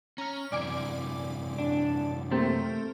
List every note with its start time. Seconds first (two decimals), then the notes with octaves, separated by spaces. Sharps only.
0.18 C#4 A#5 F6
0.52 F#2 C3 E3 D5 G#5 D6
1.58 D4
2.31 A3 A#3 C4 G4